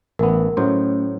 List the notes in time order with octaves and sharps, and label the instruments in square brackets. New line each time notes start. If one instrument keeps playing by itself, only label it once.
[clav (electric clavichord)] A1 B3 [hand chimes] A#4
[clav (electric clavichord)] A2 F#3 C5 [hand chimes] A3 C#4